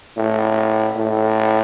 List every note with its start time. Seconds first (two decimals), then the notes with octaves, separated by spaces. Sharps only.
0.17 A2
0.96 A2